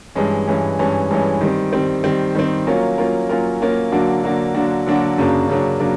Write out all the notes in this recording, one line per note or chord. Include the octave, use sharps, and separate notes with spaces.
G2 E3 G#3 C#4
G2 E3 G#3 C#4
G2 E3 G#3 C#4
G2 E3 G#3 C#4
D#3 G3 C4
D#3 G3 C4
D#3 G3 C4
D#3 G3 C4
F#3 A#3 C#4 F4 A#4
F#3 A#3 C#4 F4 A#4
F#3 A#3 C#4 F4 A#4
F#3 A#3 C#4 F4 A#4
D3 F#3 A#3 D4 F#4
D3 F#3 A#3 D4 F#4
D3 F#3 A#3 D4 F#4
D3 F#3 A#3 D4 F#4
F#2 C#3 F#3 A#3 D4
F#2 C#3 F#3 A#3 D4
C#3 F#3 A#3 D4